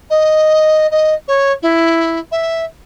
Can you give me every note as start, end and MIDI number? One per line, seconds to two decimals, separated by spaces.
0.10 0.87 75
0.91 1.13 75
1.28 1.52 73
1.62 2.19 64
2.31 2.64 76